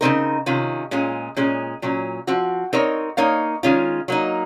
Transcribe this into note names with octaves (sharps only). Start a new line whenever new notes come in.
C#3 F#3 C4 D#4 A#4
C3 D#3 C#4 F4
A#2 G#3 C#4 F4 G#4
A#2 G#3 C#4 G#4
A#2 F#3 C#4
F3 C4 F#4
C4 D#4 A#4 C#5
A#3 D#4 A#4 C#5 F5
D#3 G#3 C#4 F4
F#3 A#3 D#4